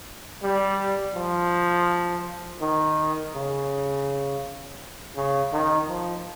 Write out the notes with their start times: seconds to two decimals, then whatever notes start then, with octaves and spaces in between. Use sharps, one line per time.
0.43 G3
1.15 F3
2.61 D#3
3.34 C#3
5.16 C#3
5.53 D#3
5.88 F3